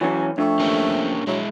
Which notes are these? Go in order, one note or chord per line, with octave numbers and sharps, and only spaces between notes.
E3 F#3 C#4
F2 A3 D4 C#6
A#3 C#4 G4
F#3 G#3 E4